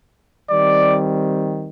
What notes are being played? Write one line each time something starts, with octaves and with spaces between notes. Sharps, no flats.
D#3 G3 C4 D5